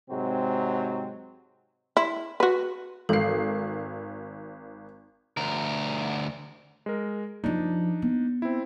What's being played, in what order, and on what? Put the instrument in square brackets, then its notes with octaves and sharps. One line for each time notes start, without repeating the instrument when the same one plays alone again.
[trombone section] G#2 C3 F#3 G#3 C4
[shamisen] E4
F#4 B4
[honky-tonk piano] G#1 C7 [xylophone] A4 F5
[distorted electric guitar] D2 A#4
[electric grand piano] G#3 A#4
[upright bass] F#2 F3 [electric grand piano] D4 D#4
[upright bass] B3
[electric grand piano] C4 E4